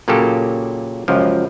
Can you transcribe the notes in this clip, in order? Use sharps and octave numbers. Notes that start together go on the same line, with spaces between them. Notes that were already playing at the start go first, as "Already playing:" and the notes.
A#2 C#3 F#3 A#3 G4 A4
C#2 F#2 F3 G4